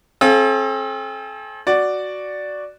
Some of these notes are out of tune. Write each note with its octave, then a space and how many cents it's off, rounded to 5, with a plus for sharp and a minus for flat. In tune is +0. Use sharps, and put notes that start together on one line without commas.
C4 +40 A4 -40 F5 +0
F#4 +0 D5 +0